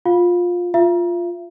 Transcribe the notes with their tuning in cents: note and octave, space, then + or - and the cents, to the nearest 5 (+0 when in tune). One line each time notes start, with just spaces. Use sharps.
F4 +15 F5 +20
F4 +0 E5 +40